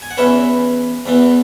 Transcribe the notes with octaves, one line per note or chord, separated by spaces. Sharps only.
G#5
F#5
E2 E3 C#4 B4 E5
E2 E3 B3